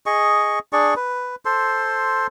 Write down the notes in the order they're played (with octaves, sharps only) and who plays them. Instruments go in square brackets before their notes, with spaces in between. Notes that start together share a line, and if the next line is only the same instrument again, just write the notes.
[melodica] G#4 D#5 C#6
D4 G#4 D5 C#6
B4
A4 C5 C6